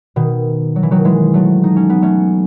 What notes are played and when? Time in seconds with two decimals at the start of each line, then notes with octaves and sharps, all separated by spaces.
0.16 B2 D#3
0.76 F#3
0.83 E3
0.91 D#3 F#3
1.05 E3 G#3
1.34 F#3 A3
1.64 D#4
1.76 C#4
1.90 B3
2.02 A3 C#4